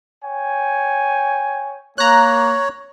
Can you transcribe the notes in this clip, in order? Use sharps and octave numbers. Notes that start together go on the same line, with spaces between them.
C#5 G5 G#5
A#3 C#5 A#5 F#6